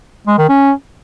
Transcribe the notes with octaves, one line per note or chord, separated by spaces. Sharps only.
G#3
D#3
C#4